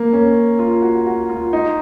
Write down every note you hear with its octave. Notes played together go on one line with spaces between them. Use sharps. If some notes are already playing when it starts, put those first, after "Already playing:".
Already playing: A#3
C#4
F4
F#4
F#4
F4
D#4